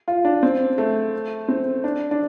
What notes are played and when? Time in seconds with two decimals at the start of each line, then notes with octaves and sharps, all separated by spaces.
0.08 F4
0.25 D4
0.43 C4
0.78 A3
1.48 C4
1.84 D4
2.11 D4